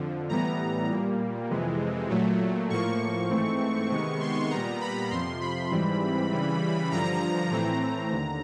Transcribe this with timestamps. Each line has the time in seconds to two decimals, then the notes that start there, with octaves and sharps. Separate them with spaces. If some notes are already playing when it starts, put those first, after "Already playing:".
Already playing: F2 D3 F3
0.29 A2 E3 G3 B3 A#5
0.89 A#2 G3 A#3
1.50 F2 C3 E3 G#3
2.10 A#2 F#3 A3
2.70 A2 F3 A#3 C#6
3.30 G#2 E3 A3 C4
3.90 C3 D#3 G#3 B3 C#6
4.21 C6
4.50 A#2 G3 B3 A#5
4.81 B5
5.11 F2 C3 F3 C6
5.41 B5
5.71 G#2 E3 G3 C4
6.31 C#3 E3 G3
6.92 G2 D3 F3 A#5
7.52 A2 E3 A3 C4 A#5
8.12 D#2 D3